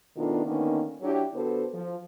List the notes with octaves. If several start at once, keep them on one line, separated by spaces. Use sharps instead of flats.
B2 D#3 A3 B3 D4 F4
D3 D#3 A#3 B3 C#4 D#4
F#3 D4 E4 G4
D3 B3 F#4 A4 C5
F3